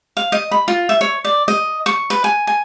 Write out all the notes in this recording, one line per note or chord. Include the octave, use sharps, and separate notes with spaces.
F5
D#5
B5
F4
E5
C#5
D5
D#5
C#6
B4
G#5
G#5